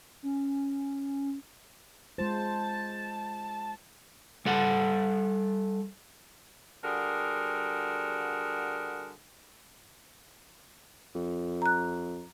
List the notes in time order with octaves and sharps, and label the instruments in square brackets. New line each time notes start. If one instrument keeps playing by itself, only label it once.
[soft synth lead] C#4
[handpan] G#3 F4 C5 [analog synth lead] A5
[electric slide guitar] G3 A4 F#5
[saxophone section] D3 G3 F#4 G#4 A#4
[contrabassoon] F2
[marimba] A#5 F#6